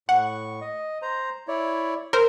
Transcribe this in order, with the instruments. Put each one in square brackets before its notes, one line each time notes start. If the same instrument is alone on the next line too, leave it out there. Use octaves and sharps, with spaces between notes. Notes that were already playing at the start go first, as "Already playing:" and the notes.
[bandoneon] A2 C#6 [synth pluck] F#5
[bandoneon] D#5
C5 A#5
E4 C#5 D5
[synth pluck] A#4 C5 [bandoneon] E6